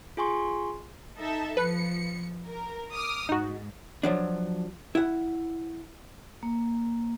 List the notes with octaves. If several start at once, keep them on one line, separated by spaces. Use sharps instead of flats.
F4 G#4 G#5 C6 C#6
D#4 A4 E5
F3 B4 C#7
A#4
D6 D#6 F6
G#2 D#4 F#4
F3 F#3 D4
E4 F#5
A#3